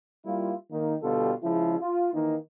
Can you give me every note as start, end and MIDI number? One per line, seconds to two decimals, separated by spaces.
0.25 0.54 55
0.25 0.54 58
0.25 0.54 64
0.25 0.54 65
0.71 0.96 51
0.71 0.96 58
0.71 0.96 63
1.03 1.32 47
1.03 1.32 50
1.03 1.32 55
1.03 1.32 65
1.03 1.32 67
1.03 1.32 69
1.42 1.76 49
1.42 1.76 53
1.42 1.76 56
1.42 1.76 64
1.80 2.08 65
2.14 2.36 51
2.14 2.36 52
2.14 2.36 58
2.14 2.36 63